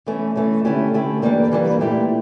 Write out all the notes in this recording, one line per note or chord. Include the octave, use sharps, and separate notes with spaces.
E3 A3 C#4
E3 A3 C#4
D3 A3 C#4 E4 G4
D3 A3 C#4 E4 G4
G2 E3 G3 A#3
G2 E3 G3 A#3
A#2 A3 E4 G4